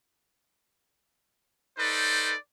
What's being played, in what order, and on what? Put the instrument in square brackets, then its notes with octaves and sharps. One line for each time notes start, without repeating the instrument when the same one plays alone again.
[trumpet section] D#4 A4 B4 C5 D5